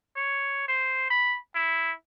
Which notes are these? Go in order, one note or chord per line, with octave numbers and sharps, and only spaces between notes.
C#5
C5
B5
E4